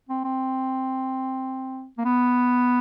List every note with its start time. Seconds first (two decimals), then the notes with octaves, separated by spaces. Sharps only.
0.09 C4
0.24 C4
1.98 A#3
2.05 B3